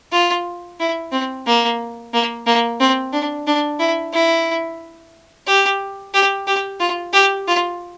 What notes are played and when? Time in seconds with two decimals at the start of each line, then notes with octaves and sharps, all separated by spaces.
0.12 F4
0.80 E4
1.12 C4
1.46 A#3
2.13 A#3
2.47 A#3
2.80 C4
3.13 D4
3.47 D4
3.80 E4
4.13 E4
5.47 G4
6.14 G4
6.47 G4
6.80 F4
7.14 G4
7.47 F4